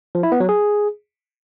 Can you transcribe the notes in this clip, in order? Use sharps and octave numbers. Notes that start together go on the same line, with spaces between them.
F3
E4
B3
F#3
G#4